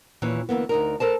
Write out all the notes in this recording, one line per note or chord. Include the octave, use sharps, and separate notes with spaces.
D#2 A#2 E3 C#4 C#5
D2 E3 A#3 B3
D2 D#4 A#4
A4 A#4 C5 A5